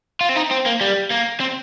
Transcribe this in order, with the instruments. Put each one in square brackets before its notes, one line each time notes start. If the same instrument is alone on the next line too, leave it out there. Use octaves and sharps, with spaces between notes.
[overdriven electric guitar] F4
C4
D#4
C4
A#3
G3
A#3
C4